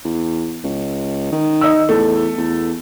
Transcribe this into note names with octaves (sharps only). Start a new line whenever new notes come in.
E2
C#2
D#3
D#4 E6
E2 A3
E2